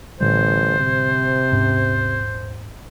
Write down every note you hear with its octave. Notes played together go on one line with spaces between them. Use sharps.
A1 A2 D3 G3 C5
C3
D#1 G#2 C#4